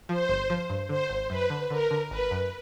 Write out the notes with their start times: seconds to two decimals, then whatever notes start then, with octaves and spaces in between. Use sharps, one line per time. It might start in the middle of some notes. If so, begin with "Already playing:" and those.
0.09 F3 C5
0.29 G1
0.50 F3
0.70 G2
0.89 D3 C5
1.09 G#1
1.30 F#2 B4
1.50 D3
1.70 D3 A#4
1.91 D3
2.11 G#1 B4
2.31 F#2